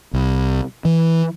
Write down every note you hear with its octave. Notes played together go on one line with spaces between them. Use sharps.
C2
E3